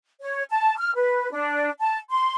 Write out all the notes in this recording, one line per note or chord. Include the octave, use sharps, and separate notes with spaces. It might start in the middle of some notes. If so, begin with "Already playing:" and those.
C#5
A5
F6
B4
D4
A5
C6